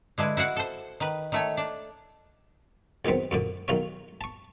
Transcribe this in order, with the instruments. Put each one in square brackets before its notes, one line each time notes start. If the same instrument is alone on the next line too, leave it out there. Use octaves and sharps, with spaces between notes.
[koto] D3 G#3 E4 B4
E4 F#4 F5 F#5
A4 C5
D#3 B4
D#3 A3 C#5
D4
[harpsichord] C#2 D#3 F#3 B3 C4
F#2 A#2 D3
B1 D#3 F4 C#5
A5 C#6